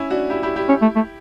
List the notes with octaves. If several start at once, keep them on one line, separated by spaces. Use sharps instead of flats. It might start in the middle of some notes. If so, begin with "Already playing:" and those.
Already playing: C#4 E4
D4 F#4
E4 G4
E4 G4
E4 G4
C#4
A3
A3